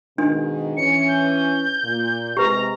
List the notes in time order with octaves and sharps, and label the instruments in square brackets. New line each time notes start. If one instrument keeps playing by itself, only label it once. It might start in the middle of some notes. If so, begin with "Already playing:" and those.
[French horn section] G#2 B2 D#3 [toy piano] D4
[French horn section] E3 C#4 [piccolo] C#7
[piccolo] G6
[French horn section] A#2
[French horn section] C3 G#3 [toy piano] G4 B4 [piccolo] A#5